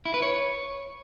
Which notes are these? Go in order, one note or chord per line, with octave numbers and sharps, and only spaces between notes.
E4
B4
C#5